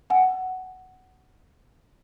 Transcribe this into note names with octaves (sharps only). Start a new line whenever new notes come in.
F#5 G#5